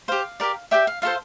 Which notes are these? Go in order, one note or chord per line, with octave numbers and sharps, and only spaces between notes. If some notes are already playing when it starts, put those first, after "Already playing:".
G4 C5 F5
G4 A#4 D5
G4 D5 E5 G5
F5
F4 A4 C5 F5